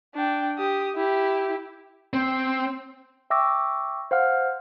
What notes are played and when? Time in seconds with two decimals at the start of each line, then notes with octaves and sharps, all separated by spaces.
0.15 D4 G5
0.58 G4 D#6
0.96 E4 G4
2.13 C4
3.30 E5 G5 C#6 D6 E6 A#6
4.11 C5 F5 F#5 F6